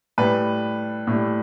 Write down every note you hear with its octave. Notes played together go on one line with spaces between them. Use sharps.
A2 G3 B4
A2 G3